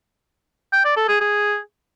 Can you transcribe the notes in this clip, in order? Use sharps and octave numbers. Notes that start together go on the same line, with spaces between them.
G5
D5
A4
G#4
G#4